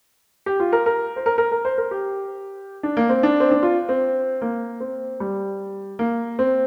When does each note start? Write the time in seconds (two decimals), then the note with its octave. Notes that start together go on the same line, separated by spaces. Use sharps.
0.46 G4
0.60 F4
0.73 A#4
0.86 A#4
1.16 C5
1.26 A#4
1.38 A#4
1.52 A#4
1.65 C5
1.78 A#4
1.91 G4
2.83 D4
2.97 A#3
3.09 C4
3.23 D4
3.40 C4
3.51 D4
3.63 F4
3.89 C4
4.42 A#3
4.80 C4
5.20 G3
5.99 A#3
6.39 C4